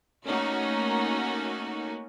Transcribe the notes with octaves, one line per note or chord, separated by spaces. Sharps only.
A3 A#3 C#4 D#4 F#4